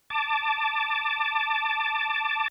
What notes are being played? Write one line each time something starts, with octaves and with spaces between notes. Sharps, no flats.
A5 D6